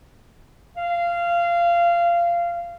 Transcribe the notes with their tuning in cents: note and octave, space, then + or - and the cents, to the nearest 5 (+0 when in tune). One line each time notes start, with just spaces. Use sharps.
F5 -20